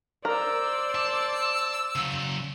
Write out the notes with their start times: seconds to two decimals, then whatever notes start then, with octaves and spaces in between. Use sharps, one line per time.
0.25 A#4 C5 D5 E6
0.95 A5
1.95 C#3 F#3